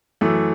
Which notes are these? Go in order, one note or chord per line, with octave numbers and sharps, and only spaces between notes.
F#2 E3 A3